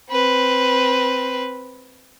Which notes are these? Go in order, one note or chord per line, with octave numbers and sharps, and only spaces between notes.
C4 B4